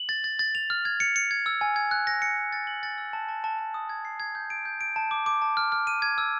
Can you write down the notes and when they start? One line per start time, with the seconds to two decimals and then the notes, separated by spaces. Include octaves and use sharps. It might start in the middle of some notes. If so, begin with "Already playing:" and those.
Already playing: F#7
0.09 A6
0.24 A6
0.39 A6
0.55 F7
0.70 F6
0.85 G#6
1.00 C#7
1.16 C#7
1.31 G#6
1.46 E6
1.61 G#5
1.76 G#6
1.91 F#6
2.07 A#6
2.22 C#7
2.37 A#6
2.53 A6
2.67 F#7
2.83 A6
2.98 E6
3.13 A5
3.29 A5
3.44 A5
3.59 A5
3.74 D#6
3.89 G#6
4.05 C7
4.20 G#6
4.35 G6
4.50 D7
4.65 G6
4.81 D7
4.96 A5
5.11 D6
5.26 D6
5.42 A5
5.57 F6
5.72 F6
5.87 D#7
6.02 G#6
6.18 E6